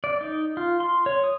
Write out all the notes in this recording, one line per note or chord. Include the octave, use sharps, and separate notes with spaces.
D5
D#4
F4
C6
C#5
D#6